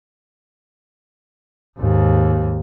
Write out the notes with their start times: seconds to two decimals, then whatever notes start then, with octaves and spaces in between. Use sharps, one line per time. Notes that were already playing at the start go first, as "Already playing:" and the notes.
1.78 D#2 G#2